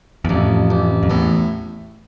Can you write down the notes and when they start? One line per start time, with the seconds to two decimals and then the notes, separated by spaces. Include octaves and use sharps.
0.25 E2
0.29 A1 F2
0.70 A1
1.03 F2
1.10 E2 A2